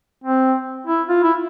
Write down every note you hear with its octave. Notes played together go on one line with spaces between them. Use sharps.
C4
E4
F4
E4